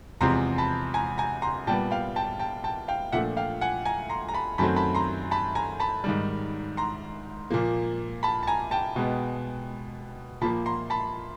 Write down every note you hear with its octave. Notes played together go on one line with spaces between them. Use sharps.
E2 C3 F3 G#3 C4 A#5 C6
A5 B5
G#5 A#5
G#5 A#5
A#5 C6
A#2 G3 B3 G5 A5
F5 G5
G5 A5
G5 A5
G5 A5
F5 G5
A#2 F3 A3 D4 E5 F#5
F5 G5
F#5 G#5
G#5 A#5
A#5 C6
A#5
A5 B5
F#2 D#3 F#3 A3 C4 A5 B5
A5 B5
A#5 C6
A5 B5
G#5 A#5
A5 B5
G#2 D#3 G3
A#5 C6
A#2 F3 A#3
A5 B5
A5
G#5 A#5
G5 A5
B2 G#3 B3
A#2 F3 A#3 A5 B5
A#5 C6
A5 B5